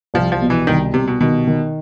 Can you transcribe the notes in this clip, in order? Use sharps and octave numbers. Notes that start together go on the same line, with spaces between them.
C2 F3
F3
B2
E3
C2 D#3
C2 C3
B2
B2 D#3
D#3